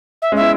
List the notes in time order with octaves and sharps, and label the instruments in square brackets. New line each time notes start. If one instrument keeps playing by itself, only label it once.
[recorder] E5
[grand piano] G#3 C#4
[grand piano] B3 E4 [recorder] E5